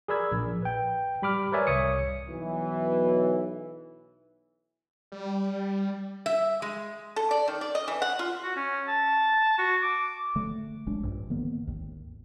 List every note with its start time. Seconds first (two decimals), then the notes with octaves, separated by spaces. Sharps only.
0.08 G#4 A#4 D5 B5 E6 G#6
0.32 A#1
0.62 B4 G5
1.22 G3 B5 D6 F6
1.52 A#4 B4 C#5 D5 E5 G#5
1.67 C2 C#5 D#6 C#7
2.29 B1 E3
5.12 G3
6.26 E5
6.62 G#3
7.16 A4
7.31 D5
7.48 D#3
7.61 D5
7.75 D#5
7.88 E3
8.02 F#5
8.19 F4
8.43 F#4
8.56 C#4
8.88 A5
9.58 F#4
9.82 D6
10.35 D3 A3
10.86 G#1 G#3 D4
11.03 A#1 G2
11.30 D3 D#3 A#3 B3
11.67 G#1 D#2